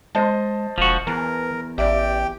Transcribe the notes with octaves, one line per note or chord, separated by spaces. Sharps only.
G#3 C5 D#5 A5
E1 F3 F#4
E2 E3 A#4
A1 G4 D5 E5 G5